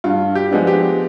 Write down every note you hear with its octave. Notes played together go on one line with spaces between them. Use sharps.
G2 F4
G4
F3 G#3 B3 D4
G4